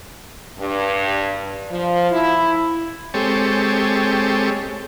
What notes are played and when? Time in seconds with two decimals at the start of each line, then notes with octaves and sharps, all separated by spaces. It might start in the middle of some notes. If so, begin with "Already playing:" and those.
0.59 G2
1.71 F3
2.12 E4
3.14 G#3 C4 G4 A4 C#5